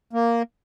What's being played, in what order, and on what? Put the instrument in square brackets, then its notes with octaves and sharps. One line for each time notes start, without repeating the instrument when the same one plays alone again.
[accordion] A#3